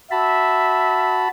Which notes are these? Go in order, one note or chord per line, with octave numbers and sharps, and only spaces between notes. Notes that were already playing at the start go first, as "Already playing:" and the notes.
F#4 E5 A5 B5